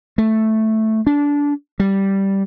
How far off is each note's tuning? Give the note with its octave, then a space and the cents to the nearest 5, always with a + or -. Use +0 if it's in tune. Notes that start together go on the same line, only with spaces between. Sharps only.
A3 +0
D4 -20
G3 -5